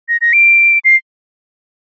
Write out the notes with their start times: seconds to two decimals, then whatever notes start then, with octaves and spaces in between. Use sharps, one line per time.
0.09 A#6
0.21 A#6
0.33 D7
0.85 C7